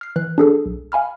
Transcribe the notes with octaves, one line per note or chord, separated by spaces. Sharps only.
F6 C7
E3 F#6
D4 G#4 A4
B1
F5 G#5 B5 F6